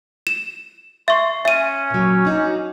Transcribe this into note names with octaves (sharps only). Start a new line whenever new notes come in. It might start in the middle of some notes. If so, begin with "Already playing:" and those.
E7
E5 C6 C#6
C#4 E5 D#7
A#2 F#3
D4 D#4 F#4